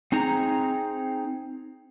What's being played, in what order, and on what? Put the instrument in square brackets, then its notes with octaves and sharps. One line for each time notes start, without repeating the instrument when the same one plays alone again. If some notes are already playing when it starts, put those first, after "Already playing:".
[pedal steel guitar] C4 D#4 G#4 A#5